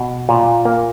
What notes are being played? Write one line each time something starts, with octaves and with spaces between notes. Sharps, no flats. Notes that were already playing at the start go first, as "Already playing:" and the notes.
Already playing: B2
A#2
A#3